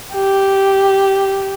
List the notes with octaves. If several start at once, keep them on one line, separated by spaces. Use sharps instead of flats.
G4